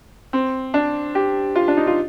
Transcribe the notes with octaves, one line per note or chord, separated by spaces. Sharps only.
C4
D4
G4
F4
D4
D#4
F4